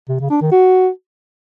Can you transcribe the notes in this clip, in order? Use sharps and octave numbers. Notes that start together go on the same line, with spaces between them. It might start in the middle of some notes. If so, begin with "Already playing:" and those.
C3
C#3
D4
D#3
F#4